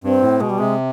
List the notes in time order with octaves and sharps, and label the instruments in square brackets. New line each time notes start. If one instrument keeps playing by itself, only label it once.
[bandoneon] G2 [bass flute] C4
[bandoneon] A2
[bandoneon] B2 [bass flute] G#3
[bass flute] G3
[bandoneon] C3 [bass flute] G#3